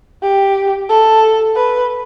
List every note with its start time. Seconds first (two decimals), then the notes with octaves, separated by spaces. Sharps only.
0.23 G4
0.89 A4
1.56 B4